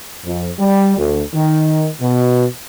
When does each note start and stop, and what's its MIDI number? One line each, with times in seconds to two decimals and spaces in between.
0.25 0.50 41
0.60 0.96 55
0.97 1.22 38
1.34 1.88 51
2.01 2.45 47